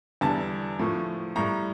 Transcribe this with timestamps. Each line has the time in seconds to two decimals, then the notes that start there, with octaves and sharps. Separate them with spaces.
0.21 E2 D3 G3 A5
0.79 A2 F3 A3
1.36 A2 G3 A#5